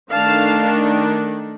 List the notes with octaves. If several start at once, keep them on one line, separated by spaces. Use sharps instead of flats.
D#3 A3 D4 F5 A5